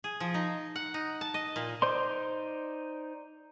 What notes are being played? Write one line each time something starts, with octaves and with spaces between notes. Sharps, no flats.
G#4
F3
D#4
F#5
D#4
A5
D#5
A#2
D#4 C5 D5 C6